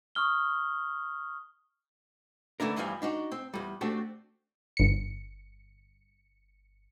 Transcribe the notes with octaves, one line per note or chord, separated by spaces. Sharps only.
C#6 D#6 F6 G7
D3 E3 A3 D4 A#4
E2 G2 E3 F3 G3 G#5
D4 D#4 F#4
C4
E2 G3
A3 C4 D4 F#4 G4
G1 C#7